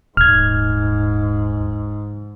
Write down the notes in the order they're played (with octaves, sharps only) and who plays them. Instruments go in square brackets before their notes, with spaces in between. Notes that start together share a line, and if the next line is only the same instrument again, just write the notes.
[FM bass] D#1 [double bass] G#2 [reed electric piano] F6 G#6